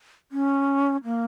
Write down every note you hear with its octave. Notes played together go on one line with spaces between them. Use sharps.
C#4
A#3